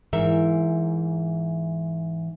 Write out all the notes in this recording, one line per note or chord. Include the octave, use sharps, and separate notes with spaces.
G#2 E3 A#4 E5